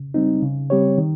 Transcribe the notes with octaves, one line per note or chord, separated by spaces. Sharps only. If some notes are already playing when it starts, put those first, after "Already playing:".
Already playing: C#3
G3 C4 D#4
C#3
G3 C4 G4 C#5
D#3